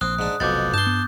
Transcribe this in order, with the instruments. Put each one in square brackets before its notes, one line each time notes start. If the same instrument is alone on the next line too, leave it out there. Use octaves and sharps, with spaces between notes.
[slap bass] A#1 [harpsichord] C4 [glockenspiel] D#6 F#6
[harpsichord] G#2 D4
[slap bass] F1 B1 [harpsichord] F2 B2 [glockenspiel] D6 G6 A6
[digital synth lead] G2 [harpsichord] A5 C6 [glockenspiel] G6
[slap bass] B3